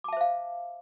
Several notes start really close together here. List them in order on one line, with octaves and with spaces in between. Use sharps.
D6 A5 E5 C5 F5